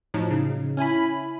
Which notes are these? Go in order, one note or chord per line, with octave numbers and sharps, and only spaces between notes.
A2 F3 F#3 D#4
C#3
C#4 E4 G#5 B5